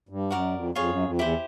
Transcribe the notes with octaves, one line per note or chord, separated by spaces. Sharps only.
G2
F#2 F#4 A#4 D5
F2
F2 F4 G#4 C#5
F#2
F2
E2 E4 G4 C5